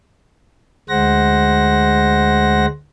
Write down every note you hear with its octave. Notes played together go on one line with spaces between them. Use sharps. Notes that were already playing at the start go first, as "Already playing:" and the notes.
D2 G#3 C5 F#5 A#6